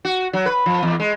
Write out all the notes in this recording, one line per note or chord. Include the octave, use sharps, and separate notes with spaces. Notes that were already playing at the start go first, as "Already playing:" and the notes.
F#4
F#3
B4
F3
E2
G#3